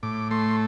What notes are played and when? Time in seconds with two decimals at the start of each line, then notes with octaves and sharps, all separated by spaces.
0.03 A2 D6
0.31 A3 C6